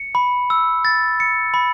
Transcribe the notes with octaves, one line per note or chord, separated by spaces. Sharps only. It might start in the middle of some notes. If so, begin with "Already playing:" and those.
Already playing: C#7
B5
E6
A6
C#7
B5